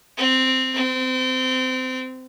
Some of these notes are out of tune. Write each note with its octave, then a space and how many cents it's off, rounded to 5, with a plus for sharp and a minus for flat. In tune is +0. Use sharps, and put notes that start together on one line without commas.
C4 -5
C4 -25